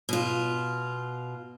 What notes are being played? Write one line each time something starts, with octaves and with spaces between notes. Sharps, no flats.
B2 F4